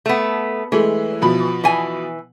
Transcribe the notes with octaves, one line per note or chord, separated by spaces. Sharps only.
A3 B3
E3 G#3 A3
B2 F3 B5
E3 G#5